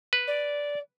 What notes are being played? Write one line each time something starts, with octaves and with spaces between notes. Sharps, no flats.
B4
D5